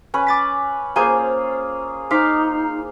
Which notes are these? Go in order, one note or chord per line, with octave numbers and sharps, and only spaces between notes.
C#4 B4
D6 A6 B6
A#3 F4 G#4 C5 G#5 G6
D#4 C5 F5 D6 B6